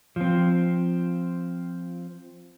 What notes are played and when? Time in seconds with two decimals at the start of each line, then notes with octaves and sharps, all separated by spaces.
0.16 F3 C4